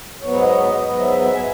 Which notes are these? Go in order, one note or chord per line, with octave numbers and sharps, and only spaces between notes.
G#2 F#3 B3 C#5
D#5
D#5
G#2 F#3 B3 D#5
E5
E5
G#5